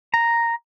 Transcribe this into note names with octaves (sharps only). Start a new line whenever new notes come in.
A#5